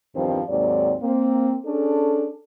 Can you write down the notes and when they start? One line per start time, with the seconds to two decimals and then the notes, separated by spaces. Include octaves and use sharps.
0.16 E2 G2 D#3 F3 C4 D#4
0.49 D#2 G#2 F#3 C4 D5
1.01 A#3 C4
1.65 C#4 D4 G#4 A4